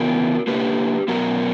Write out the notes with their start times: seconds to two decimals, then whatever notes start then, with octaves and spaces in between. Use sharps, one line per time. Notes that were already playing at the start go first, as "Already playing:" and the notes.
Already playing: C#3 E3 B3 F#4 A#4
0.47 D3 A#3 G4 B4
1.08 B2 F#3 B3 F#4 A#4